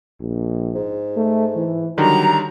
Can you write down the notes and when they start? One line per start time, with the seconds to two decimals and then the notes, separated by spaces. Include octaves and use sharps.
0.21 A#1
0.75 G#2
1.16 A3
1.56 E3
1.98 D3 D#3 F#3 G3 A#5